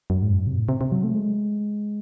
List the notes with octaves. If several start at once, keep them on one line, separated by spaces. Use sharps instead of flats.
F#2
G#2
F#2
C3
A2
C3
C3
F#3
A3
G#3